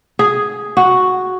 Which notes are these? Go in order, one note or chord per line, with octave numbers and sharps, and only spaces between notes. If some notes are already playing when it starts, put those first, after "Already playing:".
G#4
F#4